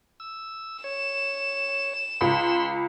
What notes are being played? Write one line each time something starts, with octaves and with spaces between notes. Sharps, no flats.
E6
C#5 E7
C#2 B5 C6